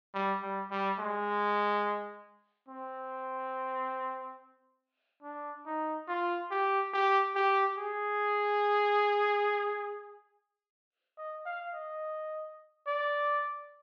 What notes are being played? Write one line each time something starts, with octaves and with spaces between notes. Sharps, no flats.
G3
G3
G3
G#3
C4
D4
D#4
F4
G4
G4
G4
G#4
D#5
F5
D#5
D5